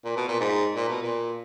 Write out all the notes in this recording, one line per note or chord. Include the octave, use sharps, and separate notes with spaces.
A#2
B2
A#2
G#2
A#2
B2
A#2